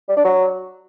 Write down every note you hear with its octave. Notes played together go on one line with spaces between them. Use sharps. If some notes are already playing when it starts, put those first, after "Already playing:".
G3
D4
F#3